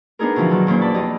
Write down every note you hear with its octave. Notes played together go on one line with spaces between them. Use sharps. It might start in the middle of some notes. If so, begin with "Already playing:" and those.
B3 D4 D#4 G#4 A#4
B2 D3 E3 F3
B2 D#3 F#3
E2 A#2 C#4 C5
D5 A5 B5
F2 G4 D#5